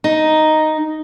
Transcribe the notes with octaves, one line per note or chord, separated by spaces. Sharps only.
D#4